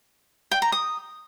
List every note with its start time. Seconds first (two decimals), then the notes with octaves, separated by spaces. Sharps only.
0.51 G5
0.62 A#5
0.72 D#6